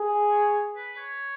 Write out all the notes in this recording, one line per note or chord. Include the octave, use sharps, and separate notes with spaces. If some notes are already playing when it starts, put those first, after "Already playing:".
Already playing: G#4
C#5
B4
C#5